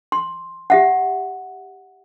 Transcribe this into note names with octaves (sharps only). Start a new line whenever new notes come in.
C6
G4 E5 F#5